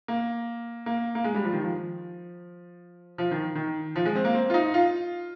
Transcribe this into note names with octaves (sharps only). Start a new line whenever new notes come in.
A#3
A#3
A#3
G#3
G3
F3
D#3
F3
F3
D#3
D#3
F3
G#3
C4
A#3
C4
F4
D#4
F4